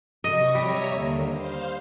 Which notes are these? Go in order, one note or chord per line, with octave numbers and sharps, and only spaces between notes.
C3 D#5 C#6 A#6
G3 C#5 E5 A#5
D#2 D3 A#3
C5 F5